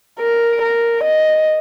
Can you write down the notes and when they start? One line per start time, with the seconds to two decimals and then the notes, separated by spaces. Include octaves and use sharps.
0.20 A#4
0.62 A#4
1.04 D#5